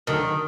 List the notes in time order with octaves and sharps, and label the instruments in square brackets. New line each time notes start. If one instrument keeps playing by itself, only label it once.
[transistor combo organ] D2 D3 F#3 [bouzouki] D#3